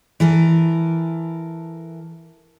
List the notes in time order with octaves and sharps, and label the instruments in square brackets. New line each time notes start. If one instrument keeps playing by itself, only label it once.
[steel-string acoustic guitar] E3 A4 A#4